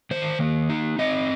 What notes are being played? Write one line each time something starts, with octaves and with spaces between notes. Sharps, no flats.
D#3 C5
A#3
D#4
C4 D#5